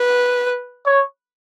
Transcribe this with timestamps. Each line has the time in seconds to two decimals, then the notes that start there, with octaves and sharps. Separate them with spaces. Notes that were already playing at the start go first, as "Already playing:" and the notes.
Already playing: B4
0.86 C#5